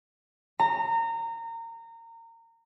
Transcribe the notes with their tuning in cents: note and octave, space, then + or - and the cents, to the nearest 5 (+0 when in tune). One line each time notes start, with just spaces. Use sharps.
A#5 -25